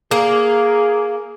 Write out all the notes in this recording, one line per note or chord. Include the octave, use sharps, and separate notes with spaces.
A#3 G#4